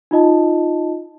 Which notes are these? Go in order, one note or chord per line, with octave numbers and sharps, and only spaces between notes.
D#4 F4 D#5 A5